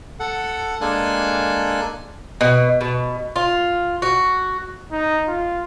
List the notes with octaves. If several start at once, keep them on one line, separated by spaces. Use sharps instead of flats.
A4 F#5
G#3 A#3 D4 A4 G#5 F#6
B2
B2
F4
F#4
D#4
F4